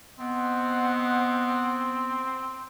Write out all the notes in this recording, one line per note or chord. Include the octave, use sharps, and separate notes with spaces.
B3 C4 C5 D#5 F#5